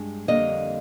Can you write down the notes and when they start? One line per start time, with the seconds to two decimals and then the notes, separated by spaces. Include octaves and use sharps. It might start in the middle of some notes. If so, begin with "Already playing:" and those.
Already playing: G2 G#3
0.28 F2 D3 G3 A#3 D#5